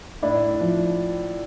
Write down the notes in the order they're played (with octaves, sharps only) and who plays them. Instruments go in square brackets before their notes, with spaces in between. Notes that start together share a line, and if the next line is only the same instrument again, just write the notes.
[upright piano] A2 D4 E4
F3